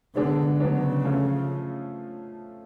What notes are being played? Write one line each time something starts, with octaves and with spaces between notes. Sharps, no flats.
D3 G#3 B3 D4 G#4
C#3 F#3 B3 D4
F3 A3 C#4 F4